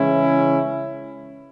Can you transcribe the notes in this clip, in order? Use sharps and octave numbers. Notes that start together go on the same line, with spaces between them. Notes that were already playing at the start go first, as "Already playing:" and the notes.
Already playing: C#3 E3 G#3 C#4 E4